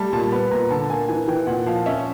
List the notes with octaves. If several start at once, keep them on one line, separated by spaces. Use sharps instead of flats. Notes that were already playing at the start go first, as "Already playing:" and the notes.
Already playing: G3 A3 A5
A#2 A5
B3 B5
A#2 A#5
D3 A5
A#3 G#5
E3 G#5
E3 G5
A#2 F#5
F3 F5
C#4 E5